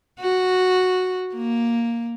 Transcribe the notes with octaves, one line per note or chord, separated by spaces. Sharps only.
F#4
A#3